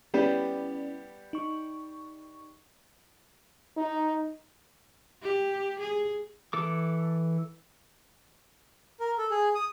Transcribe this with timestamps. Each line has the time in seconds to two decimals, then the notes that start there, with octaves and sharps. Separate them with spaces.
0.14 G3 B3 C#4 E4 G4 D5
1.33 D#4 C#6
3.77 D#4
5.22 G4
5.80 G#4
6.53 E3 A4 D6
9.00 A#4
9.18 A4
9.31 G#4
9.55 D#6